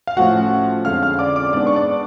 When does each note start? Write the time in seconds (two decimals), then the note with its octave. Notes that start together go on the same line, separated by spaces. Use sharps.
0.07 F5
0.17 A2 F3 A3 C#4 F#4 F#5
0.85 F2 D3 G#3 C#4 F5 F6
1.03 F5 F6
1.19 D5 D6
1.36 D5 D6
1.53 G#2 G#3 B3 D4 D5 D6
1.67 C#6
1.76 D5 D6